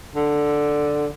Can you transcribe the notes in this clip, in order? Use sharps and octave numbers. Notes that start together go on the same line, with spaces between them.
D3